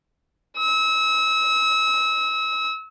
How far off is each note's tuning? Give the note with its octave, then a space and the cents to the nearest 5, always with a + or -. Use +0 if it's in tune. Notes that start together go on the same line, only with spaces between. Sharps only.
E6 -35